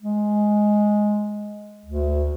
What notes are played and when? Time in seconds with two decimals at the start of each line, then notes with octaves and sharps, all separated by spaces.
0.02 G#3
1.85 D2